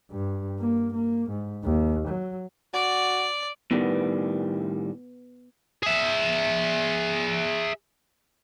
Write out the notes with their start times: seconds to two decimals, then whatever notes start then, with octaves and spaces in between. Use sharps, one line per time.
0.11 G2
0.59 A#3
0.93 A#3
1.30 G#2
1.64 D#2
2.08 F#3
2.74 F#4 D5
3.71 A2 D#3 G3 B3
5.83 G#4 E5